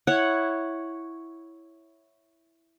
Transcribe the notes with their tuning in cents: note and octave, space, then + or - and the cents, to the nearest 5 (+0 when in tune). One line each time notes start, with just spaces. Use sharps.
E4 +0 C#5 +0 F#5 +0